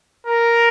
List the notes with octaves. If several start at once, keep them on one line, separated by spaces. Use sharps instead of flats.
A#4